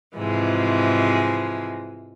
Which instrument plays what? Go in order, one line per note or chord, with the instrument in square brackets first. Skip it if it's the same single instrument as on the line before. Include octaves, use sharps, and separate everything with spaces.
[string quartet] G#2 C3 E3 F3 G#3